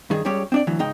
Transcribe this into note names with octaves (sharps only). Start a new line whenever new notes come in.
G2 D#3 G#4
C#2 C#3 G3 G4 C#5
C4 D4 D5
D2 E3 F#3
C#2 G#2 D#4 G5